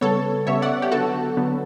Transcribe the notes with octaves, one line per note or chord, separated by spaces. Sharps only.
C#3 G3 B3 A4 C#5
C#3 G3 B3 C#5 E5
D5 F#5
G4
D3 F#3 B3 F#4 A4
D3 F#3 B3